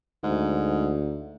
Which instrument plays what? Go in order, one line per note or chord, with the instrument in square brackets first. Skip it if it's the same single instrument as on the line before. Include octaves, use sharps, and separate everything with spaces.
[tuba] D2 [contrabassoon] G#2